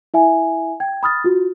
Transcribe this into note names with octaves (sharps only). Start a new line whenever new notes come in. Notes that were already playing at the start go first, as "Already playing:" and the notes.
E4 E5 G#5
G5 G#6
B5 D#6 F6 A6
F4 F#4